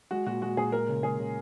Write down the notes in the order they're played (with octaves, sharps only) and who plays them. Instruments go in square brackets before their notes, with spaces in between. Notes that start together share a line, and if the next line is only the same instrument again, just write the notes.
[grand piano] G#3 F#4
A#2 F#4
G#3 F#4
A#2 G#4
G#3 A#4
C#3
G#3 G#4
C#3